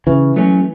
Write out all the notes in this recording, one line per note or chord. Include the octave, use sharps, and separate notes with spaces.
C#3 E3
F#3 A3 C#4